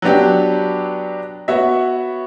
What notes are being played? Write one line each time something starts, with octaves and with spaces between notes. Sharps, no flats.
F#3 B3 D4 G4
B3 F#4 C#5 E5